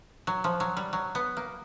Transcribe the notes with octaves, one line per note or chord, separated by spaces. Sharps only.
F#3
F3
F#3
G3
F#3
B3
A#3